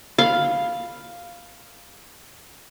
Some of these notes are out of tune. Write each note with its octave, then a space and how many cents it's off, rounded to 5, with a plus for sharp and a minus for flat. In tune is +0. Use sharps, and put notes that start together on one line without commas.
F5 +0 B5 +0